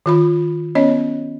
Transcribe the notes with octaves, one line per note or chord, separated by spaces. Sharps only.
D#3 F4 B5
B3 C#4 C#5 D#5